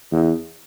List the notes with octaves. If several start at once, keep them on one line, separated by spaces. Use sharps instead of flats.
E2